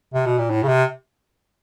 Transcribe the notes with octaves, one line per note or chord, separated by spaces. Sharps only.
C3
B2
A#2
A2
C#3
C3